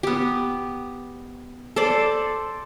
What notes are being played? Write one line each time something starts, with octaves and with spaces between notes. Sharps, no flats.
B3 G4
A4 C5 D5